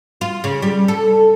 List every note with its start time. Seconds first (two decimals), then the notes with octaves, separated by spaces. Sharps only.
0.21 F4
0.44 C#3
0.62 G3
0.88 A4